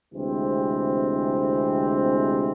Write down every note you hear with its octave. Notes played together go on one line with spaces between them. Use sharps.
D2 C3 E3 G#3 C4